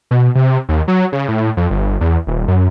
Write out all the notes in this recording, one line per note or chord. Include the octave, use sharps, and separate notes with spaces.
B2
C3
D#2
F#3
C#3
A2
F2
G1
E2
D#1
F#2